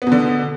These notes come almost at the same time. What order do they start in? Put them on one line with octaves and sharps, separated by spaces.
B3 B2 D3